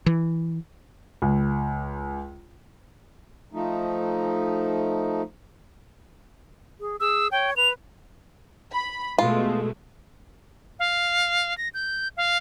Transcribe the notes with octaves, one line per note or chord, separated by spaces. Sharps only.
E3
C#2
F3 A3 D#4
G#4
G#4 E6
C#5 G5
B4 F7
B5
B2 G#3 A3 F4
F5
A#6
G6
F5